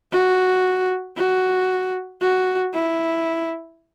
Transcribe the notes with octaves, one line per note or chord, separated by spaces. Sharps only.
F#4
F#4
F#4
E4